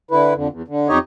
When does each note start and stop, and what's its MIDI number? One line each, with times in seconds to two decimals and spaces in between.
0.11 0.34 50
0.11 0.34 64
0.11 0.34 71
0.34 0.48 41
0.34 0.48 50
0.51 0.62 40
0.68 0.88 50
0.89 0.98 41
0.89 0.98 63
0.89 0.98 67
0.89 0.98 73
0.89 0.98 75